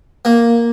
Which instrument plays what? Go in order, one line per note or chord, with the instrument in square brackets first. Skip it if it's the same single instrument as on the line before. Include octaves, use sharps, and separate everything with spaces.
[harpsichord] A#3